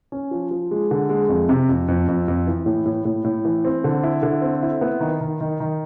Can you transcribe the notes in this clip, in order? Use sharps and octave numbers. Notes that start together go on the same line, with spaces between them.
C#4
F3
F3
G#3
D3
G#3
F2
C3
F2
F2
F2
F2
E3
A2
A2
A2
A2
E3
C4
D3
E4
D3
C4
E4
B3
D#3
D#3
D#3
D#3